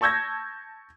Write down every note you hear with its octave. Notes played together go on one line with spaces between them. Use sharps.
A5 C#6 E6 G6 G#6 A#6